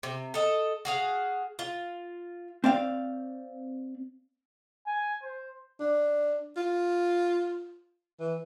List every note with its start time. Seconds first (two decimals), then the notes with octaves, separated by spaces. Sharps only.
0.03 C3
0.34 A4 D#5
0.85 F#4 G#4 F5
1.59 F4
2.64 C4 D5 F5
4.87 G#5
5.23 C5
5.80 D4
6.57 F4
8.20 E3